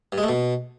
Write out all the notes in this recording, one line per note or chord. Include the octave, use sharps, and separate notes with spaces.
G2
G#3
A3
B2